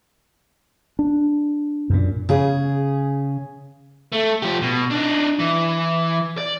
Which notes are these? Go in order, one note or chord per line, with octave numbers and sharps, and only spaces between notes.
D4
F#2 A#2
C#3 G#4
A3
F3 G4
B2
D4 D#4
E3
D5